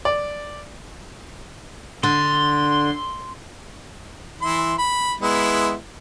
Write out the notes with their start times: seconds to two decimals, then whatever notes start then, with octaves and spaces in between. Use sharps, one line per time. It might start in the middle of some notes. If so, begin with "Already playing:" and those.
0.05 D5
2.03 D3 C6
4.42 E3 E4 C6
4.78 B5
5.20 G#3 B3 E4